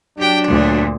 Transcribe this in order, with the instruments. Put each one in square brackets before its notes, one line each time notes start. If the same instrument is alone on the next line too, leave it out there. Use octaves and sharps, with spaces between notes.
[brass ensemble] F#3 D4 [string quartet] G4 G5
[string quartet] D2 A#2